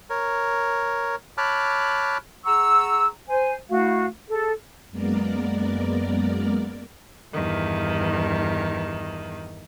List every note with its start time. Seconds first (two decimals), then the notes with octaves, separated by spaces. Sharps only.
0.10 A#4 C#5
1.38 C#5 A5 B5 D6 F6 F#6
2.45 G#4 F#5 A#5 C#6 E6
3.28 C5 G#5
3.70 A3 E4 F#4 F5
4.30 G#4 A4
4.90 F#2 G#3 A#3 B3 A#4 D5
7.32 E2 G2 D#3